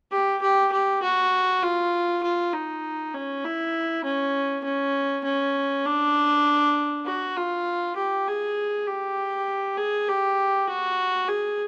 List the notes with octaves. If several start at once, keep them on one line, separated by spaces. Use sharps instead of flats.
G4
G4
G4
F#4
F4
F4
D#4
C#4
E4
C#4
C#4
C#4
D4
F#4
F4
G4
G#4
G4
G#4
G4
F#4
G#4